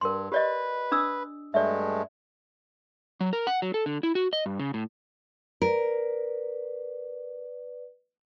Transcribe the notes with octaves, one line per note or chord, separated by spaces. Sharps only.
G2 A#4 C6
G4 B4 D5 D#5
D4 D#6 E6
G2 G#3 A3 D5 E5
F#3
A#4
F#5
F#3
A4
D3
E4
F#4
D#5
G2
C#3
A2
A#4 B4 D5